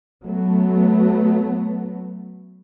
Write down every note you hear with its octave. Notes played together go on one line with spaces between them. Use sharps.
F#3 A3 B3